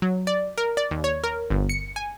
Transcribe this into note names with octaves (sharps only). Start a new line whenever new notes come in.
F#3
D5
A#4
D5
D#2
C#5
A#4
G1
C#7
G#5